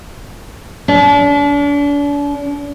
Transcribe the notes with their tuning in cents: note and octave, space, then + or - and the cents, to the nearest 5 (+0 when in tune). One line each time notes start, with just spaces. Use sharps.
D4 -40